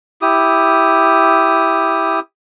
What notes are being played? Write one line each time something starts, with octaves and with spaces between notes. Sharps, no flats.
E4 G4 D#6